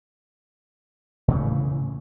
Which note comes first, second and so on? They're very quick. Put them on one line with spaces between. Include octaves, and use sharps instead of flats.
A2 C#3 E3 A3